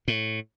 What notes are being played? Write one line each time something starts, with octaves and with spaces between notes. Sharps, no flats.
A2